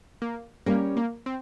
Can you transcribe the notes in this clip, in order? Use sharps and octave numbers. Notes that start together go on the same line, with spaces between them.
A#3
G3 A#3 C#4 G4 A#4 C#5
A#3
C4